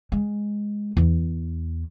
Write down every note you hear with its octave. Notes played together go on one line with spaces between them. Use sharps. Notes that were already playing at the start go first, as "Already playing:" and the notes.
G#3
E2